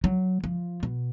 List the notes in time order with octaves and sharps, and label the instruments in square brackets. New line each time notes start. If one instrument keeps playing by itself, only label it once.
[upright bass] F#3
F3
B2